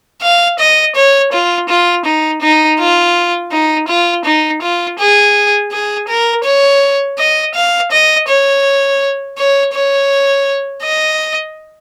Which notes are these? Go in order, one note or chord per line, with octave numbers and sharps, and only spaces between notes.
F5
D#5
C#5
F4
F4
D#4
D#4
F4
D#4
F4
D#4
F4
G#4
G#4
A#4
C#5
D#5
F5
D#5
C#5
C#5
C#5
D#5